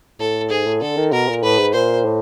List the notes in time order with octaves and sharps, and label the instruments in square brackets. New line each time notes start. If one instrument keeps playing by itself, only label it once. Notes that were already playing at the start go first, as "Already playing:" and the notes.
[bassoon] A2 [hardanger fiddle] A4
[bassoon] G#2 [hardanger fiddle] G#4
[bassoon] A2
[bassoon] D3 [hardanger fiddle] A4
[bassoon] D#3
[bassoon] B2 [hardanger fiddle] A#4
[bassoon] A#2
[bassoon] A2 [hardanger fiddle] B4
[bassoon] G#2
[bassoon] A#2 [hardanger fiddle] C5
[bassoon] A2